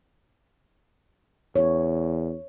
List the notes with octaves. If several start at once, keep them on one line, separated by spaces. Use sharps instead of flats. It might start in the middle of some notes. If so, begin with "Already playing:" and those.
E2 C#5